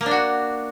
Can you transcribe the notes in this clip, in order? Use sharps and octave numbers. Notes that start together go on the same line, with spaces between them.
A#3
D4
F#4